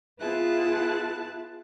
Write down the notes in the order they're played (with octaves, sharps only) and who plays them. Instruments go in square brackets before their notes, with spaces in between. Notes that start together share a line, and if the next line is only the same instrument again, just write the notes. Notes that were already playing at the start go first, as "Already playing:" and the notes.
[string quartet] B3 E4 F4 G#4 A5 F#6